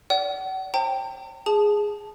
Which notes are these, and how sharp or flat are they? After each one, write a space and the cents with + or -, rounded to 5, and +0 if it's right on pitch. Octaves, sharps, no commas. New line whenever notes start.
D5 -30 F#5 +35
C5 +40 G5 +0 A#5 -45
G#4 +0 A5 -15 D#6 -20